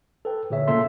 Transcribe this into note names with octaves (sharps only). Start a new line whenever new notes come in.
A4 B4 G5
A#2 D3 G#4 C#5 E5
A#2 C#3 A#3 A4 E5 C6